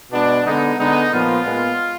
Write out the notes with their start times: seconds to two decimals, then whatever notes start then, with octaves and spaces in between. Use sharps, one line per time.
0.12 B2 G#3 B3 D4
0.46 D3 G#3 B3 D#4
0.79 D3 G#3 B3 D#4
1.12 A#2 F3 B3 F4
1.46 A#2 G#3 B3